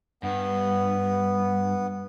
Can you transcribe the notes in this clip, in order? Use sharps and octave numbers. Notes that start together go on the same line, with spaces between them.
G2 B3